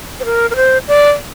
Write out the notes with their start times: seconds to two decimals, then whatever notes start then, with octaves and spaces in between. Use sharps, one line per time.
0.20 C5
0.25 A#4
0.51 A#4
0.56 C5
0.88 D5